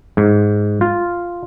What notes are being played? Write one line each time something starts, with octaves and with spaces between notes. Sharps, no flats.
G#2
F4